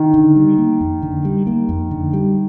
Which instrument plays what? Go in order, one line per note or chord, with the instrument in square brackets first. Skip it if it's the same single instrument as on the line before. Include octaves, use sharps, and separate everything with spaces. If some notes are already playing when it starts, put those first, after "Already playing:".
Already playing: [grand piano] D#3
[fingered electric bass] D3
G3
A#3
F2
D3
G3
A#3
F2
D3
G3